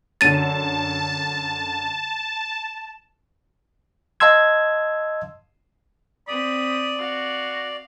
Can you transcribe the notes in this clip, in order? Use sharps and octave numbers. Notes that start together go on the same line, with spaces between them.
F#2 D3 A5 A6 D#7
D#5 F5 A5 C6 E6 G#6
C4 D5 B5 D#6
F#4 F5